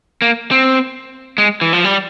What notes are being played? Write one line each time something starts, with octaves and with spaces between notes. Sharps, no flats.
A#3
C4
G#3
E3
F3
G3